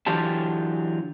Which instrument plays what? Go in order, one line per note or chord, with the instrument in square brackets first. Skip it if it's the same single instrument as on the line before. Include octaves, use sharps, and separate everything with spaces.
[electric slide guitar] D3 E3 F#3 F4 G4 A5